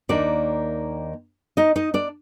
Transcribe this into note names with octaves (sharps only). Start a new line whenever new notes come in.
D#2 D#3 A#3 D4 D5
D#4 D#5
D#4 D#5
D4 D5